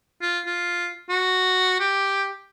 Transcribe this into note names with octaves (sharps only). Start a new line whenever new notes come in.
F4
F4
F#4
G4